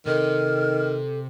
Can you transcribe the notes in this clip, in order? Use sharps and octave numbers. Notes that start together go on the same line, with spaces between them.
C3 D#3 A4 F6